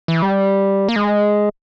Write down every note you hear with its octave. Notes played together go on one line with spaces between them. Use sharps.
E3
G3
A#3
G#3